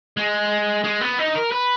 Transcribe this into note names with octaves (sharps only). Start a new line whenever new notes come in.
G#3
G#3
B3
D#4
A#4
B4